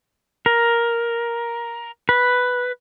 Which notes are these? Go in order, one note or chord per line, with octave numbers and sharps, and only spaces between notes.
A#4
B4